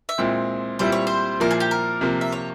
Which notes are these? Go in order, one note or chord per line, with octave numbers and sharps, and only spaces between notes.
E5
A#2 G#3 C4 E4
A#2 G3 C4 E4 C5
C#5
C5
A#2 F3 A#3 E4 A#4
G#4
G4
A#4
C3 F3 A#3
E5
C#5